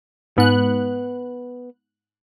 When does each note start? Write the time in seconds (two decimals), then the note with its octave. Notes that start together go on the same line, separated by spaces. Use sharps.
0.38 G#2 B3 F#6